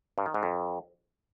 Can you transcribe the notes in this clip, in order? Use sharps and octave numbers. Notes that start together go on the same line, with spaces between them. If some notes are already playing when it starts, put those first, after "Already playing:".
G2
D#3
G#2
F2